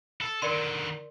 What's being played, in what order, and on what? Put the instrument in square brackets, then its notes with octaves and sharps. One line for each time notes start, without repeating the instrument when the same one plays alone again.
[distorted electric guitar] A4
[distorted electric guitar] D3 D#3 [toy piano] A#4 D5 C6